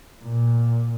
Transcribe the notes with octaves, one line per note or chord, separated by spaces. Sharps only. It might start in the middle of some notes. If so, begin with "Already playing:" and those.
A#2